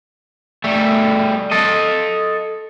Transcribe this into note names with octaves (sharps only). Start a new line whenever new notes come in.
G3 A3
A4 D#5